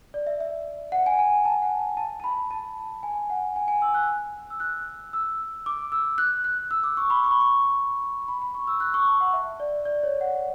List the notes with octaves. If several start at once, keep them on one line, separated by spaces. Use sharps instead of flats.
D5
E5
E5
F#5
G#5
G#5
G#5
A5
F#5
A5
A5
B5
A5
G#5
F#5
G#5
G#5
E6
F#6
E6
F#6
E6
D6
E6
F#6
F#6
E6
D6
C#6
B5
C#6
B5
C#6
B5
B5
C#6
E6
F#6
C#6
A5
F#5
E5
D5
D5
C#5
F#5